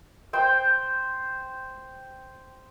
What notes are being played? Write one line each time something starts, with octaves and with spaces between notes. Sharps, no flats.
C5 G5